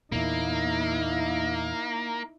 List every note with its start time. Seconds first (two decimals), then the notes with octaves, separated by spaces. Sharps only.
0.12 E2 A#2 A#3 D#4 E4